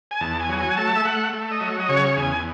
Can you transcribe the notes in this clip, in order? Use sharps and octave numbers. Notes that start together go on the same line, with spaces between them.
G#5
E2 A5
G#5
F#3
G#5
A3 A5
E5
A3 F#5
A3
D#5
F#3
D#5
C#3 C#5
E2 G#5